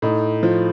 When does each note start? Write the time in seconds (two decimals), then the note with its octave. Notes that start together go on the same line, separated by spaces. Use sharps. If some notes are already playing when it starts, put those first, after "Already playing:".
0.02 A2 D#4
0.43 F3